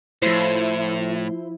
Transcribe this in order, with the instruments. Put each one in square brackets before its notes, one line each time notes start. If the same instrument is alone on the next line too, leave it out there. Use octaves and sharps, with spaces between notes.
[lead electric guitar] A2 [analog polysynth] F3 E4 [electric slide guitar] C5